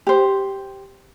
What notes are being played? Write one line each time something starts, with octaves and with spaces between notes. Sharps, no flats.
G4 C5